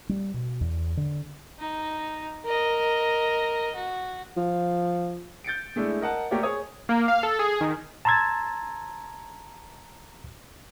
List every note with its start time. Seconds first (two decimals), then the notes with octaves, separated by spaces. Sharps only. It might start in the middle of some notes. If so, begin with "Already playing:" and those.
0.09 G3
0.34 B2
0.61 E2
0.97 D3
1.59 D#4
2.45 A#4 D#5
3.75 F#4
4.37 F3
5.44 G6 A6 C#7 D7
5.76 G#3 A3 D4 E4
6.01 A#4 D#5 F#5 A5
6.31 A3 A#3 G4 A#4 C#5 D5
6.43 G#4 C#5 D#6
6.89 A#3
7.08 F5
7.23 A4
7.39 G#4
7.61 D#3
8.05 A5 A#5 C6 E6 G#6 A6